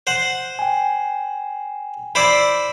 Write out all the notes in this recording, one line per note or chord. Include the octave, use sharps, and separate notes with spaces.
C5 F#5
G5 G#5
E4 C5 D5 B5 E6